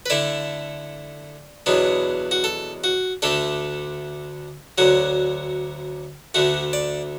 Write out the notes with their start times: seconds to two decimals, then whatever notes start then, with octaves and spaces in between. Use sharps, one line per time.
0.06 B4
0.10 D3 A3 E4 D5
1.66 E2 B2 F#3 B3 D4
2.31 F#4
2.44 A4
2.84 F#4
3.22 D2 D3 A3 D4 A4
4.78 D2 D3 F#3 F#4
6.34 D2 D3 A3 F#4
6.73 D5